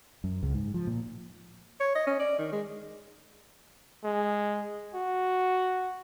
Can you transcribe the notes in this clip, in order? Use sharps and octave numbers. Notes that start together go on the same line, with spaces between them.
F#2
C#2
G#2
F3
A#2
C#5
D#5
C#4
D5
D#3
G#3
G#3
F#4